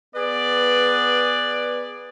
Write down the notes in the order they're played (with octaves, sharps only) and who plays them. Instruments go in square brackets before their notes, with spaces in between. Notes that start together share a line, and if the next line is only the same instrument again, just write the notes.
[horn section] B3 G#4 B4 D5